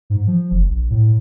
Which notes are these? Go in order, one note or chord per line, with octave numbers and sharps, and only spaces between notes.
G#2
F3
F#1
A#1
A2